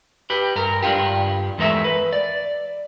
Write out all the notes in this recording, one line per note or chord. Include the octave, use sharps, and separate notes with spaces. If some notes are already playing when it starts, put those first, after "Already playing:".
G4 B4
G2 A#4
G2 D4 D#4 F4 G4
E2 G#3 A3 A#4 E5
B4
D5